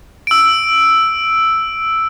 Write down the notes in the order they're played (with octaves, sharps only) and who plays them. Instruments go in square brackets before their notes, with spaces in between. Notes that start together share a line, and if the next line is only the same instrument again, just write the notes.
[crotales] E6 D7